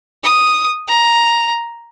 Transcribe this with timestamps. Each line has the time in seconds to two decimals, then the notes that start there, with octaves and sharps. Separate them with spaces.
0.24 D#6
0.88 A#5